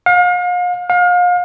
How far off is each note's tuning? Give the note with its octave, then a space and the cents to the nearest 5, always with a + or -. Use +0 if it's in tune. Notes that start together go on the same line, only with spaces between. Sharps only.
F5 +40
F5 +35